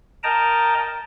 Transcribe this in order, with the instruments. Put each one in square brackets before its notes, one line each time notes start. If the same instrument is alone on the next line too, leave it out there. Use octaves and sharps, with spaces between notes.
[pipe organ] A#4 D#5 G5 A5 A#5